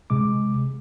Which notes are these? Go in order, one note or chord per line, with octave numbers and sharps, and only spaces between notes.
C3 G#3 D6